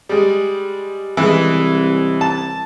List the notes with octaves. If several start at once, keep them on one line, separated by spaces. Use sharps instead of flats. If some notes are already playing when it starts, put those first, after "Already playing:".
G3 G#3
C2 E3 G#3
A5